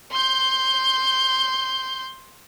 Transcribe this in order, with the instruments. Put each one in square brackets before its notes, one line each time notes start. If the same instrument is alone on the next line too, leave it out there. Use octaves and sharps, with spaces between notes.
[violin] C6 G6